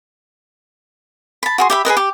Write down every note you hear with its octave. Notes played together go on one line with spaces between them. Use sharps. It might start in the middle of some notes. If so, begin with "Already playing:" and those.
A5 B5
F#4 G#4 C6
G4 E5 B5
G#4 A#4 B4 D#5
G4